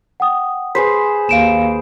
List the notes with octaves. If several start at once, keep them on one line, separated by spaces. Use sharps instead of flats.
F#5 G5 D#6
G#4 B4 C5 B6
D#2 F5 D7 E7